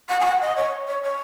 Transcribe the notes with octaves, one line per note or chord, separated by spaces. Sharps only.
F#5
G#5
F#5
D#5
C#5
C#5
C#5